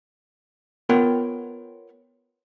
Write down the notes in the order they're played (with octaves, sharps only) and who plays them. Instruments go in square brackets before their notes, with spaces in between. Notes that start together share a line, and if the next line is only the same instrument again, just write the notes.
[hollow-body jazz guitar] B3 F4 A#4 C#5 F#5 G5